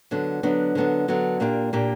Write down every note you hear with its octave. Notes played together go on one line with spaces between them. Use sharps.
D3 F#3 B3 D4
D3 F#3 B3 D4
D3 F#3 B3 D4
D3 F#3 B3 D4
A#2 A#3 D4 G4
A#2 A#3 D4 G4